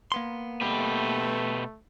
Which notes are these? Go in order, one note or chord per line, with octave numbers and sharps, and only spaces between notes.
A#3 B3 C6
B2 A3 G4 B4